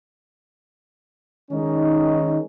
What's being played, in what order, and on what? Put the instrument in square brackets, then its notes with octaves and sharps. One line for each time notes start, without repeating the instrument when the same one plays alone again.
[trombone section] D#3 G#3 C#4 D#4